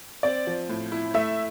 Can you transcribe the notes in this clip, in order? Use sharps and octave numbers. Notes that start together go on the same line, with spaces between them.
C4 D5
F3
A2
E4
A3 E5